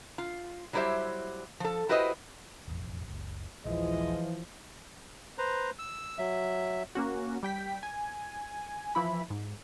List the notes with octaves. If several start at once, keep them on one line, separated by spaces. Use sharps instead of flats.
F4
F#3 G3 E4 G4 C5 E5
F3 A4
E4 F#4 G4 B4 C5 D#5
E1 A1 F2
F#1 C#2
D#1 A#1 E3 F3 G#3 E4 D#5
B4 C5 A#5
E6
F#3 E5
A#3 C#4 F#4
G3 G5 B6
G#5
E3 F3 E4 B5
G#2